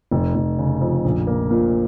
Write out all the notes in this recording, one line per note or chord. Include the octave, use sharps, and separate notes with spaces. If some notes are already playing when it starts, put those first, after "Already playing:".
F1
F1
C#3
F2
A#1
A#3
A#2